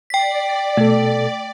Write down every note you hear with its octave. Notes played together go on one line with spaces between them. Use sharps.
D5 G5 B6
B2 A3 A4